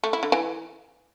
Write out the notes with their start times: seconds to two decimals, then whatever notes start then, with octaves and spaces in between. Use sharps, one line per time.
0.04 A3
0.13 E4
0.23 D3
0.32 E3